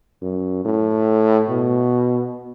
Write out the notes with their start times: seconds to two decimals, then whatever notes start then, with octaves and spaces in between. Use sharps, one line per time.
0.22 F#2
0.65 A2
1.49 B2